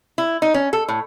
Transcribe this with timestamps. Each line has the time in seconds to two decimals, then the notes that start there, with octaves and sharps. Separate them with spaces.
0.18 E4
0.42 D#4
0.54 C#4
0.73 A4
0.89 A2